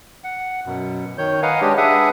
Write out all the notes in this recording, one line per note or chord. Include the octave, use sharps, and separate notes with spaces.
F#5
F#2 B2
D#3 C#5 G6
B4 D#5 F5 F#5 G#5 A#5
G#3 D4 G4 C#5 D#5
D4 G#4 B4 E5 F#5 D#6